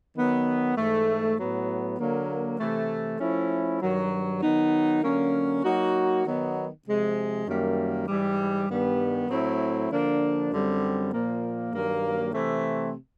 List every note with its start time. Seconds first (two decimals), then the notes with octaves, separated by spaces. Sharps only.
0.16 D#3 F#3 B3
0.77 G#2 E3 A3
1.38 A2 F#3 B3
1.99 D3 F#3 A#3
2.59 C3 E3 A3
3.20 F3 A3 C#4 E4
3.82 G2 D#3 F#3
4.42 D#3 F#3 B3 D#4
5.03 D3 F#3 A#3 C#4
5.64 F#3 A#3 D#4 F#4
6.25 D#3 F#3 B3 D#4
6.86 C3 F3 G#3
7.47 F#2 D#3 G3 A#3
8.08 G#2 E3 G3
8.68 G2 D#3 G3 B3
9.30 A2 F#3 A3 C4 E4
9.90 D3 F3 A#3 D4
10.51 F#2 D3 G3 C4
11.12 A#2 F3 A#3
11.73 G2 D#3 F#3 A#3
12.34 C3 E3 A3 C4